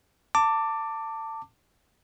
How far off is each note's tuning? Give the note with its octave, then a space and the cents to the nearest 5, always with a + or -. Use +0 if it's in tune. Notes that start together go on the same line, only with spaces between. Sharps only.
A5 +25 D6 +0